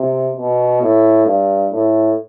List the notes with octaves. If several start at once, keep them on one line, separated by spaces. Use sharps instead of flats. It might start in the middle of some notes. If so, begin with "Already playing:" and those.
Already playing: C3
B2
A2
G2
A2